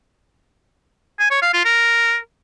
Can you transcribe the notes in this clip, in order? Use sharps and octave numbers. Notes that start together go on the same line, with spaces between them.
G#5
C#5
F5
F4
A#4